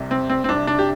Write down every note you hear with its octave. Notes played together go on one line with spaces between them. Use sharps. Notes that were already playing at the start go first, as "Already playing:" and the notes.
Already playing: C2 C3
C4
C4
C4
C2 C3 D4
D4
G4